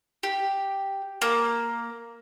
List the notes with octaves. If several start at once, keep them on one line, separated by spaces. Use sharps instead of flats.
G4
A#3